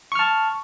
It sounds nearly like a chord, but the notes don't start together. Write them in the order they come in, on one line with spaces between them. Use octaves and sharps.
C#6 F6 A5